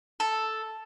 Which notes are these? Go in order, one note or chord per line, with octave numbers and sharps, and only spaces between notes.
A4